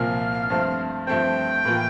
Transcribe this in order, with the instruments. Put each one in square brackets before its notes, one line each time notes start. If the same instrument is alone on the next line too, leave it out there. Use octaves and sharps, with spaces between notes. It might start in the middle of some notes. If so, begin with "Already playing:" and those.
Already playing: [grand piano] C2 A#2 F3 A#3 [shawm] F5
[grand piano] G2 F3 A3 C4
[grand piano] G2 F3 A3 C4 [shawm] G5
[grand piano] A2 E3 A#3 F4